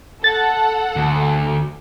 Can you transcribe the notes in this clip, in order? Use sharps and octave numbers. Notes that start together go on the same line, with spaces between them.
A4 F#5 A6
D2